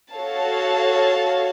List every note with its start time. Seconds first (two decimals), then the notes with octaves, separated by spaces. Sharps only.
0.13 F#4 A4 C#5 F5 A5